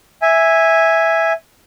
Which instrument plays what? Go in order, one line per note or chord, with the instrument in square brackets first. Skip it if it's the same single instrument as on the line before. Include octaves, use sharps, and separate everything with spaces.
[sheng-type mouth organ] E5 G#5